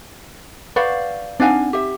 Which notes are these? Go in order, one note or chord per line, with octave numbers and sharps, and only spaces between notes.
B4 C5 D5 F5 F#5 C#6
C4 D4 D#4 F5 F#5 G#5
G4 E5